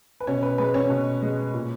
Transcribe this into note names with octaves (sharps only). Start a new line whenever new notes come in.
B4
B2 C#4 C#5
B4
G#3 B4
C#4 C#5
B2
G#3
A#2